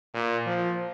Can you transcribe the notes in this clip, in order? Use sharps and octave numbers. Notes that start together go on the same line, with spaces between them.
A#2
F3